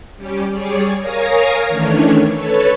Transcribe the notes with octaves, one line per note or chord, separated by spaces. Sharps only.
G3 C#4 G4
G3 G#4 C#5 D5
A#4 C#5 F5 G#5 D#6 A#6
D#3 E3 A3 C#4 D4 C#5
A4 B4 C#5 A5